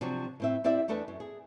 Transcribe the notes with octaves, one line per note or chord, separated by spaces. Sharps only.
C3 F3 F#3 D4 F#4
A2 C4 E5
C4 E4 G4 D5 E5
E2 A3 D4 A4 B4
F#2
G#4